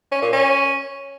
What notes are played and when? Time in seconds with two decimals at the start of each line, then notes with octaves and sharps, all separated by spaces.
0.12 C#4
0.22 A#2
0.33 C#4